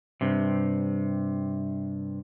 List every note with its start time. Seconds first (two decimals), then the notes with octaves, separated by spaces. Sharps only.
0.21 G2 C3